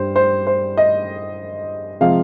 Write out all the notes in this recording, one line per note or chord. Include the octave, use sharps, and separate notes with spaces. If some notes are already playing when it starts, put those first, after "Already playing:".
Already playing: G2 G3 C5
C5
C5
D#5
C3 F3 G#3 F5